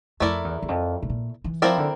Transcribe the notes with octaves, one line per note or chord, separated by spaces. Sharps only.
F2 A3 E4 A#4 D5
E2
E2
F2
A2
A#2
E3
F3 C4 E4 A#4 D5
D3